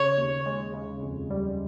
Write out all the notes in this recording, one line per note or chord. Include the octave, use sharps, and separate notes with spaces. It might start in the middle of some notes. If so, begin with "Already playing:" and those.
Already playing: C#3 C#5
D#2
G#3
C#3
F2
G3